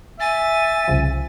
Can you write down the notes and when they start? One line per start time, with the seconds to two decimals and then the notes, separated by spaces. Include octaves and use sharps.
0.20 E5 G#5 A6
0.88 C2 C#3 F3